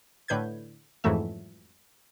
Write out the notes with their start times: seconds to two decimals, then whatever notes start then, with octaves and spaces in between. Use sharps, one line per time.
0.28 A2 D3 B4 G6 G#6
1.04 F2 G#2 E3 F#3 A3 E5